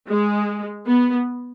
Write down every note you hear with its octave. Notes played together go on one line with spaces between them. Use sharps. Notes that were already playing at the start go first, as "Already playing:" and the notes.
G#3
B3